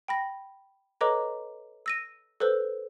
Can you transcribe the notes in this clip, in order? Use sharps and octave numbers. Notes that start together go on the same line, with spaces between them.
G5 B5 A#6
A4 B4 C#5 D#5 A#5 D6
E6 A#6 D#7
A4 B4 C5 E6